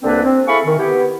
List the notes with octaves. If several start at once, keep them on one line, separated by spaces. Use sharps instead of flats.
C2 D3 A#3 C4 D4 B4
C4
E4 G#4 A4 F5 B5 C#6
D#3
B3 E4 G4